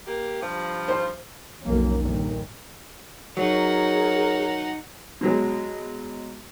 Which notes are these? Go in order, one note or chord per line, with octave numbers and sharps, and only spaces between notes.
A#3 G4
G2 F3
C5
B1 F2 F#3 A#3 C#4
G1 A#2 D#3
F#3 D#4 G#4 A#4 C#5 F#5
B2 F#3 G#3